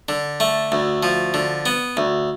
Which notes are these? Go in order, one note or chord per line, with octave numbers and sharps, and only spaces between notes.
D3
A3
D2
F3
D3
B3
D2